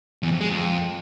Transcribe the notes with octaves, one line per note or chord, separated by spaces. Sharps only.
E2
F2
G#3
F2